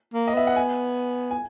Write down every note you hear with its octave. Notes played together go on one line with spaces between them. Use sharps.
A#3
D#5
B3 E5
F#5
G#5
G#5